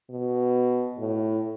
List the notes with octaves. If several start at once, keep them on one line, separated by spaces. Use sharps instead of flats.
B2
A2